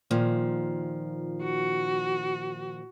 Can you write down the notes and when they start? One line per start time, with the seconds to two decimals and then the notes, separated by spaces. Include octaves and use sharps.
0.11 A#2 D#3 F3
1.43 F#4